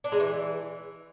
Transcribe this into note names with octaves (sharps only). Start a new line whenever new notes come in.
D4
G#3
E3